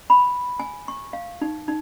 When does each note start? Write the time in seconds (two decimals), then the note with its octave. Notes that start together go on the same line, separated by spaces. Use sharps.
0.10 B5
0.60 G#5
0.88 C#6
1.13 F5
1.41 D#4
1.68 D#4